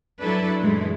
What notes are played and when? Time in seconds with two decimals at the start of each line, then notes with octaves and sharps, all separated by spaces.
0.20 F#3 D4 E4 A4 B4
0.61 F#2 A#2 E3 G#3 A3